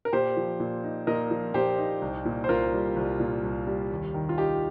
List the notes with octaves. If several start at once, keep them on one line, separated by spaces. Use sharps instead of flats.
A#4
A#2 G4 C5
F3
A#2
D#4
A#2 A#4 D#5
F3
A#2 G4 C5
D#4
C2
A#2
C5
C2 F4 A#4
G3
C2
A#2
C2
G3
D#2
D#3
F4
D#4 G4